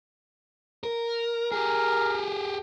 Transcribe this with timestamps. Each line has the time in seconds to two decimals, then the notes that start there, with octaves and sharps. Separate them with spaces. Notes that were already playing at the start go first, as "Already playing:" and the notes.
0.84 A#4
1.52 G4 G#4 A#4